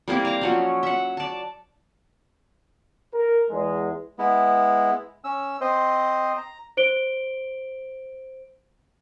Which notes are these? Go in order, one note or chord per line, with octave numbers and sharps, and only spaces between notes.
G3 A#3 C4 E4
F5 A#5
F3 F#3 C#4
E5 F#5
D5 A5
A#4
E2 G#3
G#3 B3 E4
C#4 E6
C4 C5 D#5
A#5
C5 D7 G7